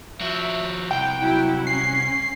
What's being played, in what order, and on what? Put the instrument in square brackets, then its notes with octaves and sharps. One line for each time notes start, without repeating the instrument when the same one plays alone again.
[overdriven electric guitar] F3 F#4 [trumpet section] E5
[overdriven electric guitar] C2 [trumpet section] F#5 [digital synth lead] G5
[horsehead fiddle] F#3 E4
[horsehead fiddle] C#4 [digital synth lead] C7